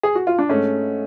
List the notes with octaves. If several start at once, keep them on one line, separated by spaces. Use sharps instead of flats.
G#4
F#4
F4
D4
G#2 A3 C#4